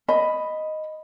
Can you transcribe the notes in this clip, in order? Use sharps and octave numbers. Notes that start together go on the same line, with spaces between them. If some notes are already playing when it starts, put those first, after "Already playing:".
D#5 B5